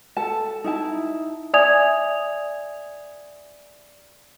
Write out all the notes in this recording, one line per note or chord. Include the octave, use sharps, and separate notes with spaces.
A4 A5
D#4 E4 A5
D5 E5 G#5 D#6 G#6 F7